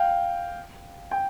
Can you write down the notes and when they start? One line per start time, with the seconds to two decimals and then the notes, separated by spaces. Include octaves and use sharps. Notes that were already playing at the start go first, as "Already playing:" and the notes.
Already playing: F5 G5
1.11 G5